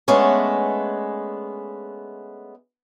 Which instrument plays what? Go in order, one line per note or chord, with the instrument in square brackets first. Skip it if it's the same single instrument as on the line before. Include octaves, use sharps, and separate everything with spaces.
[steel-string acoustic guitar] G#3 A3 B3 C#4 D4